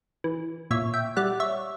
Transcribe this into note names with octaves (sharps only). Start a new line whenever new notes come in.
E3
A#2 C#5 E5
E5 G5
G3 D5 F#5
C#5 E5